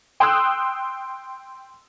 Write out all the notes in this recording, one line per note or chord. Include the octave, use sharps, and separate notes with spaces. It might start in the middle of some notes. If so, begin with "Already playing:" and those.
G5 C6 D#6 E6 F#6